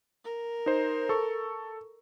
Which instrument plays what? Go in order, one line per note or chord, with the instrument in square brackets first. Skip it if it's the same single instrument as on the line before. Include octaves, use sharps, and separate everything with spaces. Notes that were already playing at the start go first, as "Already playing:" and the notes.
[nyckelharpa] A#4
[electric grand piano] D#4 C5
A4 C#6